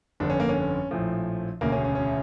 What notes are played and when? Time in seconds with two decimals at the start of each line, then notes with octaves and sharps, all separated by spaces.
0.20 G1 F2 D3 D4
0.30 C#4
0.40 A#3
0.49 C#4
0.91 A#1 A2 F3
1.61 E1 D2 C#3 A#3
1.72 C#4
1.84 C#4
1.95 C#4